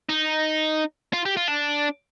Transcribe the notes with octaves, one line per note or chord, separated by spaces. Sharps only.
D#4
F4
G4
F4
D4